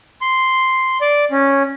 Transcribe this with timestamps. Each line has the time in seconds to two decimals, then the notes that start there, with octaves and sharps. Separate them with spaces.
0.21 C6
1.01 D5
1.31 C#4